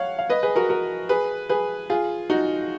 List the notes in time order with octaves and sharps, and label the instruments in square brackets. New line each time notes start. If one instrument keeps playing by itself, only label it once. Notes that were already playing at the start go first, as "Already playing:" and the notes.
Already playing: [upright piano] C#5 F5 F#5
F5
B4 D#5
G#4 B4
F#4 A#4
F#4 A#4
G#4 B4
G#4 B4
F4 G#4
D#4 F#4